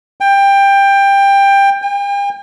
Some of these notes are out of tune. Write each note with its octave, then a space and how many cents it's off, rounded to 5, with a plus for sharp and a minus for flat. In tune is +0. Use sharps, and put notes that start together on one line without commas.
G5 +20
G5 +45